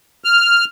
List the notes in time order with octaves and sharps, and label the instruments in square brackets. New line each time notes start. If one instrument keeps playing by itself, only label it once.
[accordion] F6